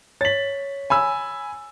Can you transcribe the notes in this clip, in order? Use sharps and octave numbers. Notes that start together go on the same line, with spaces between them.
C#5 A6 B6 F#7
G#5 B5 E6